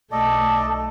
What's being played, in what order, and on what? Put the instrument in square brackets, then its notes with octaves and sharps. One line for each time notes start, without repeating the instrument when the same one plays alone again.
[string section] B1 A3 [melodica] A4 D5 D#5 [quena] A5